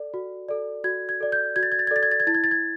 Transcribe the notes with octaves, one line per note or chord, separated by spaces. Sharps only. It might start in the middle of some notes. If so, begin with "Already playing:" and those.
Already playing: A4 D5
F#4
A4 D5
F#4 G#6
G#6
A4 D5
G6
F#4 G#6
A6
G#6
A6
G#6
A4 D5 A6
G#6
A6
G#6
E4 A6
G#6
A6
G#6